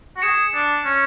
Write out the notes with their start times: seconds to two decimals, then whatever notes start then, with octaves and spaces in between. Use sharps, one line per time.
0.16 F#4
0.22 G#4 C#7 E7
0.54 D4
0.85 C#4